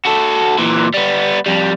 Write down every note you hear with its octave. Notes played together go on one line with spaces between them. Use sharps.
F#4 A4
A#2 E3
G3 B3
F2 G3